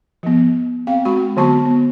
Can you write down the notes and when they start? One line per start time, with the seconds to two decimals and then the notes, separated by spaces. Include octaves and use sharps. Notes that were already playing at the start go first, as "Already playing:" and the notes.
0.23 F3 B3
0.87 C4 F5 G5
1.05 G#3 F#4 B5 C#6
1.37 D3 F#3 B3 F#4 A5 C#6
1.65 B3